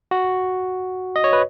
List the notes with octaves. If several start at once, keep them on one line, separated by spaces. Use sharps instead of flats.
F#4
D#5
C#5
B4